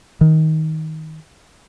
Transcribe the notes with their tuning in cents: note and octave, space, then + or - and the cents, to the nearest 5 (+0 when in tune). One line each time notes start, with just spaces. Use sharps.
D#3 +20